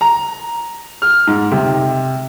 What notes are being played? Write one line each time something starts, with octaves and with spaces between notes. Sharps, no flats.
A#5
F6
G#2
C3